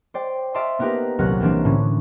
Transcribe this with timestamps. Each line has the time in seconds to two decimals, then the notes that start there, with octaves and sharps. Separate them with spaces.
0.14 C5 D5 G5
0.54 D5 E5 F5 A5 C6 D#6
0.79 A#3 B3 D#4 G4 A#4 B4
1.18 D#1 C2 F#3 A#4 F#5 F#6
1.40 E3 G3 A#3 C4 D4
1.65 A2 D3 C#4